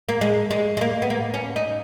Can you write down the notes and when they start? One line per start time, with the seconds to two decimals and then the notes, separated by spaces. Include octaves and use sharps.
0.09 A#3
0.21 G#3
0.51 G#3
0.77 G#3
0.81 A#3
1.02 B3
1.10 A#3
1.34 C#4
1.56 D#4